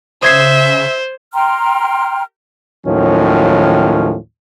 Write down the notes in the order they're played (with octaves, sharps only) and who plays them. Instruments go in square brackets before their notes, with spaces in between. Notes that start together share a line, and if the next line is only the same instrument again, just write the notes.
[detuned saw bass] C#3 [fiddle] C5 [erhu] E5 [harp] D#6 G#6 C7
[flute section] G5 A#5 C6 F6
[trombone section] D#2 A2 D#3 F3 F#3 C#4